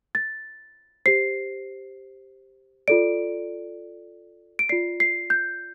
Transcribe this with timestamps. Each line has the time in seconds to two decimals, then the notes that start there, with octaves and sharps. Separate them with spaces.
0.15 A6
1.06 G4 C5 C7
2.88 F4 A4 D5 D7
4.59 D7
4.69 F4 D5 C7
5.00 C7
5.30 G6